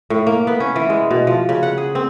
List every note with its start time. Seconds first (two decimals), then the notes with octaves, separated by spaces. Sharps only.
0.10 A2
0.27 A#3
0.47 B3
0.60 C#4
0.76 E3
0.90 G#3
1.11 B2
1.27 F3
1.49 C#3
1.63 F#5
1.78 G#4
1.95 C4